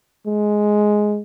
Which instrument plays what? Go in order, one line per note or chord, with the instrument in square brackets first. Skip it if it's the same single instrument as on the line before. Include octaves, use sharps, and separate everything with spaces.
[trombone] G#3